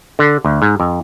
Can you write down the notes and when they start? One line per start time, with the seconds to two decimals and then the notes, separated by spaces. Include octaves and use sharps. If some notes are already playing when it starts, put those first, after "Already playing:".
0.19 D3
0.45 D2
0.62 G#2
0.80 F2